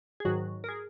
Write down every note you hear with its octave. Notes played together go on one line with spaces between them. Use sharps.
G#4
G#2 D#3 F#3 F#4
A#4
G#4